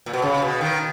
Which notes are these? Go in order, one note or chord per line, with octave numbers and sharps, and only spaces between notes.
A#2
B2
C#3
B2
D#3